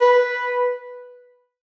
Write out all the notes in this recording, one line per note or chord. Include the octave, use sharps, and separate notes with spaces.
B4